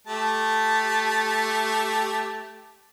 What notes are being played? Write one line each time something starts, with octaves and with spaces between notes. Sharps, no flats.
A3 G4 A5